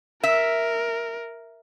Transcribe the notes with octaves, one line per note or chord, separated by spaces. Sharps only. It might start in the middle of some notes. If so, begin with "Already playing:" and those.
A#4 E5